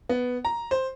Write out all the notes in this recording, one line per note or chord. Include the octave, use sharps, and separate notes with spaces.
B3
A#5
C5